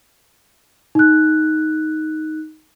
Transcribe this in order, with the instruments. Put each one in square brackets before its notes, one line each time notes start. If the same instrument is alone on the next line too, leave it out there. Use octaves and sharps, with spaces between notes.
[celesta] D#4 F#6